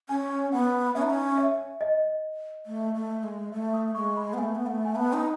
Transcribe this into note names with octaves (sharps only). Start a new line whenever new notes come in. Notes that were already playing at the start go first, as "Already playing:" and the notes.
C#4 G#5
B3 F#5
C#4 E5
D#4
C#4
E5
D#5
A3
A3
G#3
A3 E5
D#6
G#3 C#6
B5
B3
A3 G#5
B3
A3 F#5
G#5
B3 A5
D#4